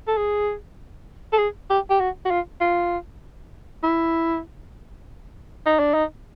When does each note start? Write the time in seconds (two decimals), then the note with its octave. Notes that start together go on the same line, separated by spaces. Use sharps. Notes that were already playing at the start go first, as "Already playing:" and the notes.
0.07 A4
0.17 G#4
1.32 A4
1.38 G#4
1.70 G4
1.90 G4
2.00 F#4
2.25 F#4
2.31 F4
2.61 F4
3.83 E4
5.66 D#4
5.79 D4
5.94 D#4